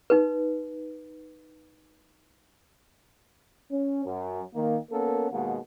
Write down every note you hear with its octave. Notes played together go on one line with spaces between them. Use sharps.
D#4 B4
C#4
F#2
D#3 A#3
A#3 B3 C#4 A4 A#4
D#2 B2 G#3 A#3 F#5